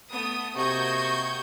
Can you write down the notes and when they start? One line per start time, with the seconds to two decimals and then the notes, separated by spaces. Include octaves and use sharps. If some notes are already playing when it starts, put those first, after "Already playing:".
0.11 A3 B3 D#6
0.56 C3 A#3 F#4 D#5 C#6 G6 G#6